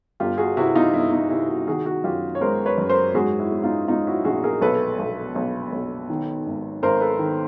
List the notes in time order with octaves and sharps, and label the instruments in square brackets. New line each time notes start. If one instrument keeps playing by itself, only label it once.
[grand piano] G1 F4 G4
F#4 G#4
C3 E4 F#4
D#4 F4
G1 E4
D#4
C3 E4
E4 F#4
D#3 F#4 G#4
F#4 G#4
F#2 F4 G4
C#5
G#3 A#4 C5
B4 C#5
F#2
A#4 C5
G#2 F#4 G#4
E4 F#4
G#3
D#4 F4
G#3 D#4 F4
E4 F#4
A#1 F#4 G#4
G#4 A#4
B1 A4 B4
B1
B1
B1
D#3
G#1
G#1 A#4 C5
A4 B4
D#3